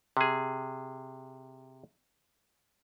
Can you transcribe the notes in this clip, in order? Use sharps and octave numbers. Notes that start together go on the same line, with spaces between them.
C3 G#4